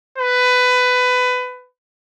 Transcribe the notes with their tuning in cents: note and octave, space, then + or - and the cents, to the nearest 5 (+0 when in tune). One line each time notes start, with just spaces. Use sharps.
B4 +20